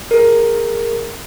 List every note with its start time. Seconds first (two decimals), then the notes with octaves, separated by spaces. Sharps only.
0.11 G#4 A#4